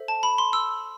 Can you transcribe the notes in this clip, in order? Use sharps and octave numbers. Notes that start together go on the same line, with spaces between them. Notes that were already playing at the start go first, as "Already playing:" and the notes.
Already playing: A4 C5 E5
A5
B5
C6
E6